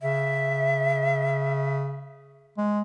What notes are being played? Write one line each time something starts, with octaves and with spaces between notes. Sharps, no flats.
C#3 E5
G#3